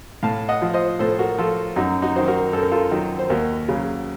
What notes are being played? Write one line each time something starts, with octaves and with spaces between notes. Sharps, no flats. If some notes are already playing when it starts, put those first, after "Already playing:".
A2 F5 A5
D#5 F#5
F3
C5 D#5
A2 A4 C5
F#4 A#4
F3 F4 A4
F#2 D#4 F#4
D#4 F#4
D#3 F#3 C5
F#4 A#4
F#2 A4
A#4
F4 A4
D#3 F#3
C5
D#2 F#4 A#4
C#3 F#3